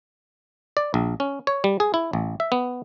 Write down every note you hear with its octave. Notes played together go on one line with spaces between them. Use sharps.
D5
A#1
C#4
C#5
G3
G#4
E4
A1
E5
B3